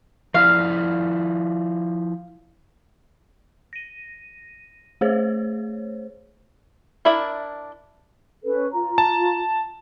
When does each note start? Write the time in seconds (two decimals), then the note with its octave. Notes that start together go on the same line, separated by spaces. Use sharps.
0.34 F3 E4 D5 F5
3.73 A#6 D#7
5.01 A3 G#4 C5 C#5
7.05 D4 E4 A#4 D5 E5
8.44 C#4 A4 B4
8.72 F4 A#5
8.98 A5